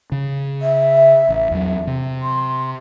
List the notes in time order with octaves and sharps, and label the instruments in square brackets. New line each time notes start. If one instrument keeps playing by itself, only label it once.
[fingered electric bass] C#3
[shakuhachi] E5
[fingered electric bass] A1
E2 F#3
C3
[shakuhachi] C6